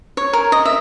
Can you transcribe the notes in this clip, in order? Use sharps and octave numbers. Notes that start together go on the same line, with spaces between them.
C#5
A#4
D#5
E5